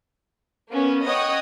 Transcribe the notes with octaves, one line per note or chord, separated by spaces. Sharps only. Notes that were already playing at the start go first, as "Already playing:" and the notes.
A#3 B3 C#4
C#5 D#5 F#5 G5 D#6